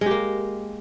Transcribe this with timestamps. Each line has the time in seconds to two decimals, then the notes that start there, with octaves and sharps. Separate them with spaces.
0.01 G#3
0.06 G4
0.11 A#3